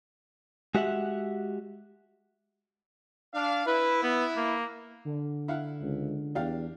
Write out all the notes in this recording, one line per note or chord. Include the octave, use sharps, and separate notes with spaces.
G#3 F#4 G4 E5 F#5
D4 F5
E4 B4
B3
A#3
D3
E4 F5 F#5
C#2
E2 D4 G4 F5